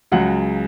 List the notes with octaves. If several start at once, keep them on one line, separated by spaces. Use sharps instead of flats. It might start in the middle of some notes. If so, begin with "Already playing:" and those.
C#2 C#3 F#3 F#5